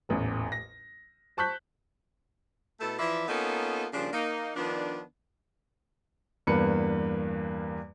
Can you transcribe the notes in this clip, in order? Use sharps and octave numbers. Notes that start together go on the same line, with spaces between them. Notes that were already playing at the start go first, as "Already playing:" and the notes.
D#1 A1 E2
A#6
C5 A5 C#6 F#6 G6 B6
B2 A3 E4 A4
E3 F3 B4 D5 E5
A#3 B3 C#4 D#4 F4 A4
D#2 C#3 F3 G3 D4
A#3 D#4
D#3 F3 B3 D4
E2 G2 A#3 B4 C#7